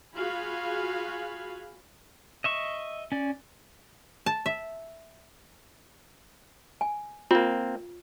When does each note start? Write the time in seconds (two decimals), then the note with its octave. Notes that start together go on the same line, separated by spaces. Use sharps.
0.15 F4 F#4 G#4 F5 G#5 B5
2.44 D#5 E5 C#6
3.12 C#4 D5
4.26 A5
4.46 E5
6.81 G#5
7.31 A#3 C4 F4